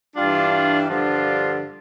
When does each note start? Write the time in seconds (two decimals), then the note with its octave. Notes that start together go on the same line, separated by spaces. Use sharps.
0.16 G2 E3 G3 D4 F4
0.88 G2 D3 F3 D4 F4